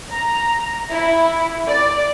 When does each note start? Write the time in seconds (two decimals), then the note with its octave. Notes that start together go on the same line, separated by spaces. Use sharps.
0.12 A#5
0.91 E4
1.67 D5